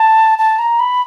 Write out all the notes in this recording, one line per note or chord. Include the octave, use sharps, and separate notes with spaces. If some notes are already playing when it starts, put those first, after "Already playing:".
Already playing: A5
A5
A#5
B5